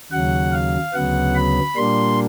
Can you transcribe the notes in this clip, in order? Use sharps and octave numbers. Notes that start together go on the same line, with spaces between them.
D#2 C#3 F#3 F#5
F5
D2 C#3 F#3 B3 F#5
B5
A#2 G3 A#3 D4 C6